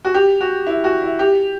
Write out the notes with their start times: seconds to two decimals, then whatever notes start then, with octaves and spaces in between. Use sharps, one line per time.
0.05 F#4
0.14 G4
0.41 F#4
0.67 E4
0.84 F#4
1.02 E4
1.19 G4